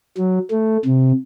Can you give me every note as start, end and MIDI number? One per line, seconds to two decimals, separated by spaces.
0.17 0.39 54
0.51 0.77 57
0.86 1.12 48